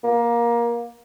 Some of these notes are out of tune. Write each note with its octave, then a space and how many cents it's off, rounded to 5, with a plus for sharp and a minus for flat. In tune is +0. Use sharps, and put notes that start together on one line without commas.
A#3 +20